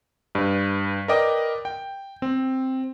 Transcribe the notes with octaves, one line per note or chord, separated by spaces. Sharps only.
G2 B4
A#4 B4 D5 D#5 G5 D6
G5
C4